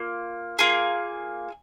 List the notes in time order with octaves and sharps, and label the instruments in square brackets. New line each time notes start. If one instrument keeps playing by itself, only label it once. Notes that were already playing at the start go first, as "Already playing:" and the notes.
Already playing: [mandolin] A#3 F4
A#3 F4 G#4